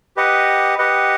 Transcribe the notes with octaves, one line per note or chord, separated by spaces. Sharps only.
G4 B4 D#5 F#5
G4 B4 D#5 F#5